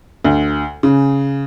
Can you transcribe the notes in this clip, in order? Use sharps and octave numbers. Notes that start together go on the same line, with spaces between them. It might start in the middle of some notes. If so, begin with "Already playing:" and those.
D2
C#3